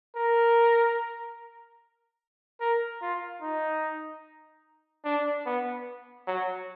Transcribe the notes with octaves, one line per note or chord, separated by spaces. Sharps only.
A#4
A#4
F4
D#4
D4
B3
F#3